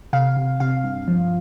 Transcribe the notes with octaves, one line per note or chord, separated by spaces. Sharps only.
C3 F5
C3
C3 F5
G2
F3